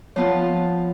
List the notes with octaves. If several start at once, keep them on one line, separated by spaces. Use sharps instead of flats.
F3 B3 F4 C#5 A5